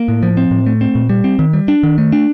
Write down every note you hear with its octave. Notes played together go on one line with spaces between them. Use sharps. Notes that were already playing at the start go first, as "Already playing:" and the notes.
Already playing: A#3
A2
F3
C4
A2
A3
C4
A#2
G3
C4
D#3
G3
D4
D#3
A3
D4